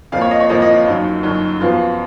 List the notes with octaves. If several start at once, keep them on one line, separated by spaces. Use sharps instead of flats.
F2 F3 A#3 F5
C#5
D#5
C#5
F2 F3 A#3 D#5
D#5
F4
F#2 D#3 F#3
F#2 D#3 F#3
F#2 F3 B3 F4